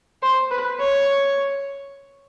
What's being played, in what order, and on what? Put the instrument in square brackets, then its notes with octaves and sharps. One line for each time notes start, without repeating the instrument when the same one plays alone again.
[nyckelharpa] C5
B4
C#5